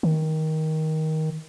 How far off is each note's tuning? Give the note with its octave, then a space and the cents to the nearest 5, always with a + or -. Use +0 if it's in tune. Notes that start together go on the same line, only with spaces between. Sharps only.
D#3 +15